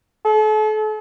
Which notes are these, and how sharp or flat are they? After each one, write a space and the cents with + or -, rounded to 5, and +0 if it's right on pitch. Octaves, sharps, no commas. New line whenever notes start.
A4 -40